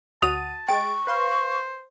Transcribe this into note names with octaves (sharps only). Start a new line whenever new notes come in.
D2 F#4 A5 D#6 D#7 F7
G#3 G5 C#6 A6 D7
B4 C5 F5 C6